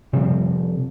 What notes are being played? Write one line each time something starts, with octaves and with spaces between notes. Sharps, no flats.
C3 F3 G3 C4